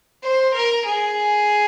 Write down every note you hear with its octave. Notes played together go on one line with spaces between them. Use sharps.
C5
A#4
G#4